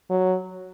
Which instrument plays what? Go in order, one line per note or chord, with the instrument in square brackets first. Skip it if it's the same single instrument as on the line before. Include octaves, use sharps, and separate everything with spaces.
[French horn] F#3